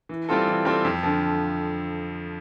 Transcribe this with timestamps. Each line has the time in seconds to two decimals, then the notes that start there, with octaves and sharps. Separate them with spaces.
0.09 E3
0.29 G3 C4 F4 A4
0.47 E3
0.65 G3 C4 F4 A4
0.85 F2
1.03 D3 F3